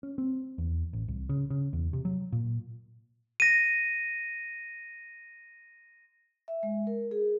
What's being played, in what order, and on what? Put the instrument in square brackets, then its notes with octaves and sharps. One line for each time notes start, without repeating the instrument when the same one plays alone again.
[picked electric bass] C#4
C4
E2
A1
C2
C#3
C#3
E2
C3
F#3
A#2
[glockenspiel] A#6 D#7
[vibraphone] E5
G#3
A#4
G#4